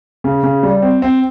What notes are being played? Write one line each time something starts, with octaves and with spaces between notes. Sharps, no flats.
C#3
C#3
G3
C4
C4